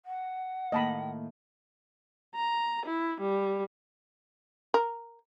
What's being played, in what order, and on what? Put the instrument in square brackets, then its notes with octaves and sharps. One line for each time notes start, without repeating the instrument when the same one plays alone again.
[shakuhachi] F#5
[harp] A2 D#3 A#3 [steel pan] D#5 A5 B5
[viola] A#5
E4
G3
[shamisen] A#4